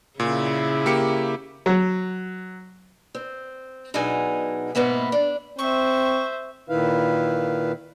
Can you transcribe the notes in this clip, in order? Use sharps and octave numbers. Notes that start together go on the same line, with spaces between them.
A#2 C#3 E4
A#3 G4 C#7
F#3
C4
B2 F#3 D4 D#4 G#4 G#5
G#2 B2 A#3 B3 E5
D4
C4 C5 E5 C#6
A#2 D#3 E4 B4 F5